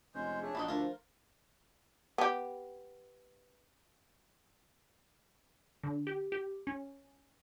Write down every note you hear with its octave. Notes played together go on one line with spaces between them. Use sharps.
F1 G#3 C#4 C5
A3 C#4 D4 G#4
A#1 E3 B3 D#4 F#4 D5
D2 F3 F4 A#4
B3 G4
D3
G4
G4
C#4